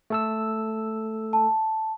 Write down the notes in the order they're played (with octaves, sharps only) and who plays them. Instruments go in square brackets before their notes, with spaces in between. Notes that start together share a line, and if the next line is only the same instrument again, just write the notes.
[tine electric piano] A3 A4 E6
[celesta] A5